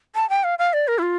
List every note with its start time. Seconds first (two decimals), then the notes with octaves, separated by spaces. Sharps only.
0.15 A5
0.29 G5
0.44 F5
0.59 F5
0.73 D5
0.88 A#4
0.98 E4
1.02 F4